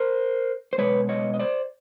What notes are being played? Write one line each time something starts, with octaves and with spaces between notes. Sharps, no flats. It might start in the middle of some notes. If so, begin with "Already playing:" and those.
Already playing: A#4 C5
C5
B2 G#3 B4 C#5
C#5 D#5
D#5
C5 D5